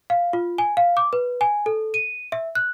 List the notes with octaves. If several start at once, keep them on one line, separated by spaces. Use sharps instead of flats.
F5
F4
G#5
F5
D6
B4
G#5
A4
D#7
E5
F#6